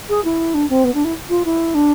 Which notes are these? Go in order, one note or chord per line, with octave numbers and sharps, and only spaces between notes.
G#4
E4
D4
C4
B3
D4
E4
F4
E4
D4